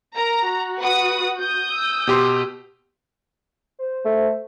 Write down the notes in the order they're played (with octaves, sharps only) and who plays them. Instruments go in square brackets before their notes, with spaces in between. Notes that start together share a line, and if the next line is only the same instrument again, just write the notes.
[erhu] A#4 [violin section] A#5
[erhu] F#4
[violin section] B4 F#5 D#6
D#6 G6
[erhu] E6
[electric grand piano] B2 G4 C6
[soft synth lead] C5
[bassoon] A3